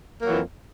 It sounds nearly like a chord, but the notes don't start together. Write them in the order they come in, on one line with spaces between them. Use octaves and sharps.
A#3 F#3 E3 F2